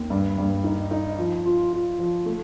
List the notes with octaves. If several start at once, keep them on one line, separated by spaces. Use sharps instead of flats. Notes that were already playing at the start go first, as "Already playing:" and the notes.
Already playing: D#2
G2
G2
D#4
D#4
F3
F4
F4
F3
A3